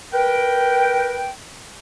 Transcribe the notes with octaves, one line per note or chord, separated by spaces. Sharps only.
A#4 B4 G5